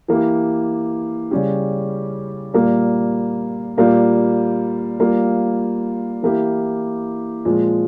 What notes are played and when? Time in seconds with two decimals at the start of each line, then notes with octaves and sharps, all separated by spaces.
0.08 E3 A#3 E4 G4
1.31 C#3 G3 C#4 G4
2.54 A#2 G3 A#3
3.77 A#2 G3 A#3 F4
5.00 G3 A#3 F4
6.22 E3 A#3 E4 G4
7.45 A#2 F3 G#3